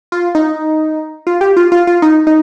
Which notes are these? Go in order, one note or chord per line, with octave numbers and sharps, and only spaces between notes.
F4
D#4
F4
G4
F4
F4
F4
D#4
D#4